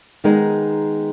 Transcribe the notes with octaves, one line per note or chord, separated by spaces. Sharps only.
D#3 G#3 B3 D#4